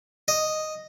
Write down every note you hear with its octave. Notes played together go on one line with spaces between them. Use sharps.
D#5